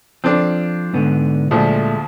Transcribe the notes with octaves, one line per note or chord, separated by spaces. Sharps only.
F3 C4 D4 A4
G#2 D3 B3
D2 A#2 F3 G#3 A3